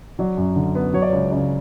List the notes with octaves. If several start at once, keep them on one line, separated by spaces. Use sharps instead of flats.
F#3 D5
F#2
D3
B3
F#3 C#5
D5
C#5
C#2
C#3 D5